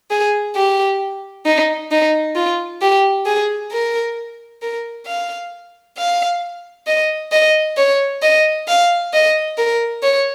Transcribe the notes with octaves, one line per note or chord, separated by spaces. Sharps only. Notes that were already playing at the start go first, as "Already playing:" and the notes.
G#4
G4
D#4
D#4
F4
G4
G#4
A#4
A#4
F5
F5
D#5
D#5
C#5
D#5
F5
D#5
A#4
C#5